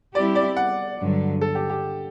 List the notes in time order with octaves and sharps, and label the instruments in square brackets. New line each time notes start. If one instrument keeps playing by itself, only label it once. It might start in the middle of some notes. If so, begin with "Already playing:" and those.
[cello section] G3 C4 E4 G4 [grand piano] D5
[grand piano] D5
F#5
[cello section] G2 D3 F#3
[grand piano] A4
G4
G4